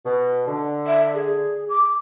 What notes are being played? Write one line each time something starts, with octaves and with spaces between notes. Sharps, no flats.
B2
D3
E5
G#4
D6